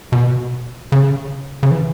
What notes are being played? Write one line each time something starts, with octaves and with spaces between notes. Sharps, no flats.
B2
C#3
C#3
E3